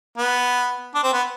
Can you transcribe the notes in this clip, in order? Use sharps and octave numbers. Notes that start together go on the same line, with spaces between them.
B3
D4
C4
B3